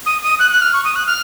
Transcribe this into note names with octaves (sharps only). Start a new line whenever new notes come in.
D#6
D#6
F#6
F#6
F6
C#6
D#6
F#6
F6